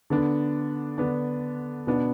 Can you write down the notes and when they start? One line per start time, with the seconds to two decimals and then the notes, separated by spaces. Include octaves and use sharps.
0.10 D3 B3 D4
0.98 D3 B3 D4
1.87 B2 B3 D4